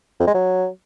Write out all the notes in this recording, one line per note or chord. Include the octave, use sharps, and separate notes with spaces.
F2
G#3
F#3